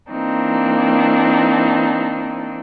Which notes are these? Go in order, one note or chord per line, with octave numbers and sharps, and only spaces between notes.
E3 A#3 C4 D4 D#4